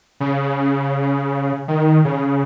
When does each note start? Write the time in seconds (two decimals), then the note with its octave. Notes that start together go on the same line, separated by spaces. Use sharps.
0.20 C#3
1.68 D#3
2.05 C#3